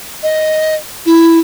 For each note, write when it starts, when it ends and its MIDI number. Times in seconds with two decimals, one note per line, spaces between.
0.23 0.75 75
1.06 1.38 64